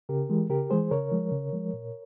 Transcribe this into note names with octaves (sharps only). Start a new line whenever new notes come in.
C#3 G4 A#4
E3 G#3
C#3 G4 A#4
E3 G#3 G#4 C5
C#3 A#4 C#5
F3 G#3
C#3
F3 G#3
A#2